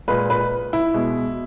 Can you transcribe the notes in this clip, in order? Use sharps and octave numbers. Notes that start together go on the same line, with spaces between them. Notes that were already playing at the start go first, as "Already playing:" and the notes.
A#2 G#3 B4
B4
E4
B2 G#3